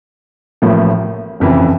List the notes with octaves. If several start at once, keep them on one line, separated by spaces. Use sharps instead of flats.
A1 A2 F3 A#3
F1 F2 C#3 E3